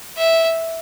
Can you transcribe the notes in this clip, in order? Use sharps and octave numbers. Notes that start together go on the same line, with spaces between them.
E5